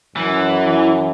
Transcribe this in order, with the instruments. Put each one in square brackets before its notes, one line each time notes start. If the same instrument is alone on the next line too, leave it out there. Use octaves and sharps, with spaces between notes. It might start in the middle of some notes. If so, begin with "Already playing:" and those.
[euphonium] F#2 [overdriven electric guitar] E3